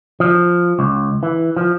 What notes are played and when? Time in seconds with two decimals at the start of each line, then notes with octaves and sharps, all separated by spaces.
0.20 F3
0.79 C#2
1.23 E3
1.56 F3